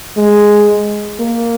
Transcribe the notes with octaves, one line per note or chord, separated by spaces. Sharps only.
G#3
A#3